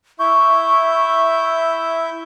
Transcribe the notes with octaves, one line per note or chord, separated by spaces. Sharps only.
E4 E5 C#6 G6